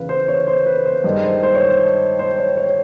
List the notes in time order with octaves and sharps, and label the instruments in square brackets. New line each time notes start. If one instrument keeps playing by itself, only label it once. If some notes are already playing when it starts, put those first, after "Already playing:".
Already playing: [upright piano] E2 C#3 B4 F5
C5
C#5
C5
B4
C5
G2 D#3 G#3
C5
C5
C#5
C5
C5
C#5
C#5